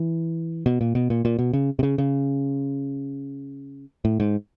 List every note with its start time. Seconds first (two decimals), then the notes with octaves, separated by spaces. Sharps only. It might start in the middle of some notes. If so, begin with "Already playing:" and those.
Already playing: E3
0.66 B2
0.81 A#2
0.95 B2
1.10 A#2
1.25 A#2
1.39 B2
1.53 C#3
1.79 C3
1.83 C#3
1.98 C#3
4.05 A2
4.20 G#2